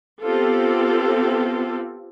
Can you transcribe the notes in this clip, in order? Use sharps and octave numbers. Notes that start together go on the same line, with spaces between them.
B3 C4 F4 G4 A4